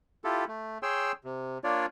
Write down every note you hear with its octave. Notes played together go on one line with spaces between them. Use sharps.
E4 F4 G4 A4
A3
G#4 C#5 G5 C6 E6
C3
A#3 D4 F4 C#5 D5